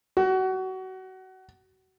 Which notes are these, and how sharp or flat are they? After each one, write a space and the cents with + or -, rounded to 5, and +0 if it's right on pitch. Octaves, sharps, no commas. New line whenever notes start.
F#4 +25